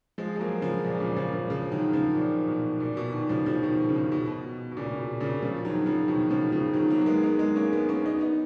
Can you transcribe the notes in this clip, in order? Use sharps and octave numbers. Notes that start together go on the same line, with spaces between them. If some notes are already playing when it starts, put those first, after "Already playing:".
F3 G#3
G#3
F#3 A#3
C#3 F3
A#2
A#2 C#3
C#3 F3
C#3 F3
C#3 F3
D#3 F#3
C#3 F3
A#2
B2
A#2
B2
B2 D#3
C#3 F3
C#3 F3
B2 D#3
C#3
B2 D#3
B2
B2
B2
A#2 C#3
C#3
B2
A#2 C#3
C#3 F3
D#3 F#3
C#3 F3
B2 D#3
C#3 F3
C#3 F3
D#3 F#3
F#3 A#3
A#3
G#3 B3
G#3 B3
G#3 B3
A#3 C#4
G#3 B3
A#3 C#4
B3 D#4
B3 D#4